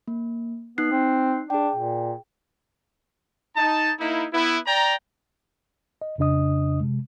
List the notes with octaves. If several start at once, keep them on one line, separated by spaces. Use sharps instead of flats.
A#3
B3 D#4 F#6 C7
C4
D4 G#4 G5
A#2
D#4 A5
A#3 D#4 E4
B3 E4
D5 G5 A#5
D#5
F2 C#3 D4 D#5 D#6
C3 G#3